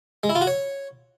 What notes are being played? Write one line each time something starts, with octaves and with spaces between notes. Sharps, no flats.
G#3
E4
F4
F#4
C#5